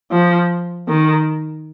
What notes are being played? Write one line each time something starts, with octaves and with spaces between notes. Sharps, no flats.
F3
D#3